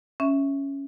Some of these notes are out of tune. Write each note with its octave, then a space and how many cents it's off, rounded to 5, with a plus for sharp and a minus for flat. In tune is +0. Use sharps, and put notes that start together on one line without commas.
C#4 +0 E5 +0